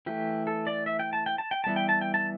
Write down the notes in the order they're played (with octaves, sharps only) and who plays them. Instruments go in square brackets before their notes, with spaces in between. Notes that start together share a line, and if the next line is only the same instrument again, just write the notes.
[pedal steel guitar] E3 A3 G4
A4
D5
E5
G5
A5
G5
A5
G5
E3 G3 B3 A5
G5
A5
G5
A5